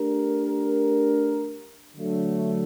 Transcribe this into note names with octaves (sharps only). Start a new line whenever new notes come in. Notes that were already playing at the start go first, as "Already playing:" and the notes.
Already playing: A3 D4 G4 A#4
D3 F#3 A3